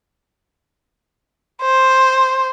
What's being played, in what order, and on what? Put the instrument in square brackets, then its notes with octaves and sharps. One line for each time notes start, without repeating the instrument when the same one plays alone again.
[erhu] C5